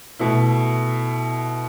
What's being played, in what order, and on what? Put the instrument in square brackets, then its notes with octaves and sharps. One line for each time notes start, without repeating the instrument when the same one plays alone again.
[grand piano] B2 A3 E4